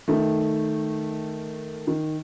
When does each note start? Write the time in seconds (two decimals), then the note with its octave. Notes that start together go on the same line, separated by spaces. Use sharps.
0.08 D#3 A3
1.87 D#3